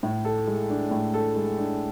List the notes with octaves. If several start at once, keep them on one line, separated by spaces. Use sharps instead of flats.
A2
A4
G#3
D4
A2
A4
G#3
D4